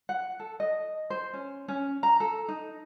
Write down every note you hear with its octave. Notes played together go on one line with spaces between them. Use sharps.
F#5
A4
D#5
C5
C#4
C#4
A#5
A4
D#4